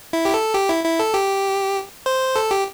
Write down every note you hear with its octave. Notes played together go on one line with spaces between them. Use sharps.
E4
G4
A4
G4
E4
E4
A4
G4
C5
A4
G4